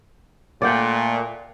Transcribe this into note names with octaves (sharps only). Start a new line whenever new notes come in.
A#2 A3 D5 F#5 G5